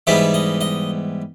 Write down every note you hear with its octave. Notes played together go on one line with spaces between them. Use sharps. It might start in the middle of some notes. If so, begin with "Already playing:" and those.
G#2 E3 G3 B3 E5
D#5
D#5